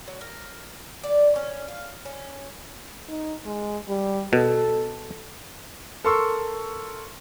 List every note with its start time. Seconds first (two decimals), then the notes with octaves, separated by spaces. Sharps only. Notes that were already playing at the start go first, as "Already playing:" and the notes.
0.07 F#3
0.21 A#4
1.04 D5
1.36 C#4
1.68 F5
2.05 C#4
3.08 D#4
3.45 G#3
3.89 G3
4.33 B2 A4
6.04 A4 A#4 C6 C#6 E6